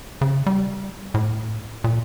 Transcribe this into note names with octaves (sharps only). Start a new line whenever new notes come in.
C#3
G3
A2
A#2